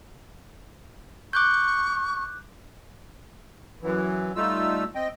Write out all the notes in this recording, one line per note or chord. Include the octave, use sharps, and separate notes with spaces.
C#6 D6 F#6 G6
F#2 E3
G3 A3 D#4 F4 E6
C4 D#5 G5